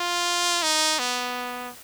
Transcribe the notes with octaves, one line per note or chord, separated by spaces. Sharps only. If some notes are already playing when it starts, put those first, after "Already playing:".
Already playing: F4
D#4
B3